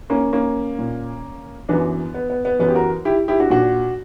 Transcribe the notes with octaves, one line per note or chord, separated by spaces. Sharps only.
A#3 C#4
A#3 C#4
A#2
F#2 E3 B3 D4
B3
B3
B3
F#2 E3 B3
G4
F#4 A#4
E4 G4
E4 G4
D4 F#4
A#2 D4 F#4